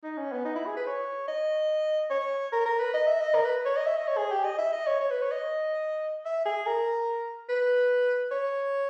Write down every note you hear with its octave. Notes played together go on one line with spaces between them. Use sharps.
D#4
C#4
B3
D#4
E4
G#4
B4
C#5
D#5
C#5
A#4
A#4
B4
D#5
E5
D#5
A#4
B4
C#5
D#5
E5
D#5
C#5
G#4
G4
D#5
E5
D#5
C#5
C#5
B4
C#5
D#5
E5
G#4
A#4
B4
C#5